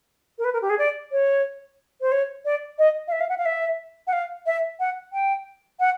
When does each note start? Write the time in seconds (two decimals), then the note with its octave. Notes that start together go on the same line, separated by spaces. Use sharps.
0.38 A#4
0.44 B4
0.53 A#4
0.62 G4
0.69 G#4
0.78 D5
1.12 C#5
2.01 C5
2.11 C#5
2.45 D5
2.78 D#5
3.08 F5
3.12 E5
3.20 F5
3.29 F#5
3.38 F5
3.45 E5
4.07 F#5
4.12 F5
4.46 E5
4.79 F#5
5.13 G5
5.79 F#5